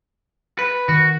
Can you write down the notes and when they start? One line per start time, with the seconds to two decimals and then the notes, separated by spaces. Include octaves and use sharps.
0.59 B4
0.89 D#3 F#4